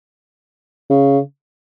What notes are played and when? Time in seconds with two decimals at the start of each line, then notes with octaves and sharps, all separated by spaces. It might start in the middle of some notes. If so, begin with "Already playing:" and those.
0.90 C#3